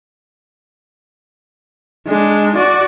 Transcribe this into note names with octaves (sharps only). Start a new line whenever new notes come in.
G#3 D4
F#4 D5